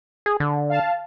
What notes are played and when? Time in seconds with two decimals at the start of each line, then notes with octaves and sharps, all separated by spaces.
0.26 G#4
0.40 D3
0.69 F5 A5